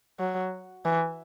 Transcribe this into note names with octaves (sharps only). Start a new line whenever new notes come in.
F#3
E3